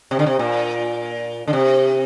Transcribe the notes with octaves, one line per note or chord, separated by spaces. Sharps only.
C3
D3
C3
A#2
D3
C3